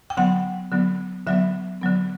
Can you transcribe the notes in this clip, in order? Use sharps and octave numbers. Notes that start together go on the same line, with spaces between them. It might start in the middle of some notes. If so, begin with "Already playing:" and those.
G5
D3 F#3 B3 F#5
D3 F#3 B3
D3 F#3 B3 E5
D3 F#3 B3